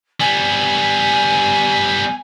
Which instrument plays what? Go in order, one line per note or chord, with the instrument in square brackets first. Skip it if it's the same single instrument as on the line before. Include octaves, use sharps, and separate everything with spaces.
[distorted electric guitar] G3 B3 [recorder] G#5